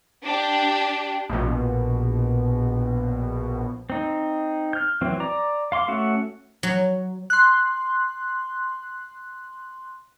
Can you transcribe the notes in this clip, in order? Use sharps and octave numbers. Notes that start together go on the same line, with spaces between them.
D4 G4
A#1 B2
C4 D#4
F6 G6
E3 F#3 C4
D5 A#5
F5 C6 D6
A3 C#4 F#4 E5 F#5
F#3
C6 F#6